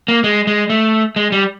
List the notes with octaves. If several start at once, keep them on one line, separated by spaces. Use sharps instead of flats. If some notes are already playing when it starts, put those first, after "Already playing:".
A#3
G#3
G#3
A3
G#3
G3